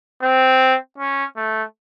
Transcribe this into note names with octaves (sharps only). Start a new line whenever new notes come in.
C4
C#4
A3